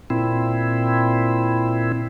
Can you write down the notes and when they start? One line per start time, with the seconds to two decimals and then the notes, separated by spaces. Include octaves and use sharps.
0.10 A#2 C4 E4